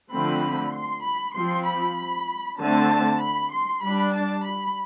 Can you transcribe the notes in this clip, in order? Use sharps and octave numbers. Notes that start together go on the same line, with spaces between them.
D3 F3 A3 C4 B5
C6
B5
F3 C4 C6
B5
D3 A3 C4 A5
B5
C6
G3 D4 B5
A5
B5